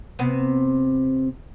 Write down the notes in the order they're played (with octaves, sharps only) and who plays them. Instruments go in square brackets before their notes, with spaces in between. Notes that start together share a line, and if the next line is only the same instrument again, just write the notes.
[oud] C3 B3